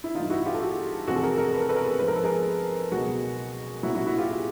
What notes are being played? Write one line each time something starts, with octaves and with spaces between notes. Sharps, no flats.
E4
G2 E3 D#4 F4
E4 F#4
F4 G4
A4
F#4 G#4
F2 C3 E3 F#4 G#4
A4
G#4 A#4
G#4 A#4
B4
A#4
A4 B4
G#4 A#4
G#2 F3 B4
A#4
A4
G#4 A#4
C#2 B2 F#3 F#4 G#4
C2 A#2 F#3 E4 F#4
E4 F#4
E4 F#4
F4 G4
F#4 G#4